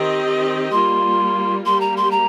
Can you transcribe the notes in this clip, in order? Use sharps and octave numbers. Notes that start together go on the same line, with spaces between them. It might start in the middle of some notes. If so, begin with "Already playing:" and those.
Already playing: D#3 C4 G4 D#5
G3 A#3 F4 C6
G3 A#3 G4 C6
A#5
C6
A#5